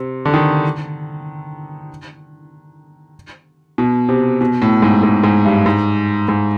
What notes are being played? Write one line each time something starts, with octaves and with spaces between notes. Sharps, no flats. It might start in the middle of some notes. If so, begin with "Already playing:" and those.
Already playing: C3
D3
D#3
B2
C3
B2
A2
G#2
G#2
G#2
G2
G#2
G#2